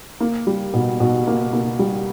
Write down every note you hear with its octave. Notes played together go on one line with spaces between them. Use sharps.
A#3
G3
B2
B2
A#3
A#3
G3